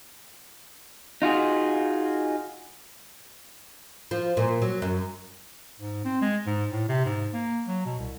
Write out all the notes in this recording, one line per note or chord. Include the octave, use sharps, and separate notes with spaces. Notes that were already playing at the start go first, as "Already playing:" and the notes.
D#4 F4 F#4 G#4
F3
A#2
F#3
F#2
G#2
C4
G#3
G#2
A2
C3
G#2
A#3
F#3
B2
C2